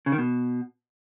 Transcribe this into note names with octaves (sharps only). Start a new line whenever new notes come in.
C#3
D#3
B2